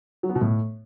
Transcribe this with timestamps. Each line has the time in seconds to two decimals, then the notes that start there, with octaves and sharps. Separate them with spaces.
0.23 F#3
0.29 B3
0.35 B2
0.41 A2